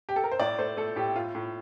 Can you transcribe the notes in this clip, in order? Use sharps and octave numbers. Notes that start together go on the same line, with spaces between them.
G4
A4
A#4
C5
A2 D5
A3 C5
A3 A4
A2 G4
A2 F4
A2